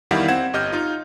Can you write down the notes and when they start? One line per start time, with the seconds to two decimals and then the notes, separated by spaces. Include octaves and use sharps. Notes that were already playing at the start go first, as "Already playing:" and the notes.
0.11 E2 D#3 G3 E4 F5 F#5
0.28 C4 F#5 G#6 E7
0.53 G1 G4 D#5 F6 G6
0.72 D#4 F4